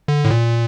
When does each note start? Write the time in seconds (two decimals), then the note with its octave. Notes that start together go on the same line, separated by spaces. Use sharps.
0.08 D3
0.25 A2
0.31 A#2